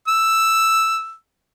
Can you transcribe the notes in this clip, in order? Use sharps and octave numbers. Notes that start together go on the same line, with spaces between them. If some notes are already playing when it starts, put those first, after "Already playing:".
E6